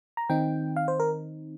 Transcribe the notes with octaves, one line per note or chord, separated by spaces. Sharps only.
A#5
D#3 C4 D#4 G5
F5
C5
A#4